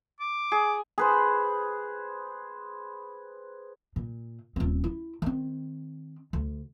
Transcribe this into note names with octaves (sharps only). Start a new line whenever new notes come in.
D6
G#4
G#4 B4 C5
A#2
D#1 C4
E4
D#3 C4
D2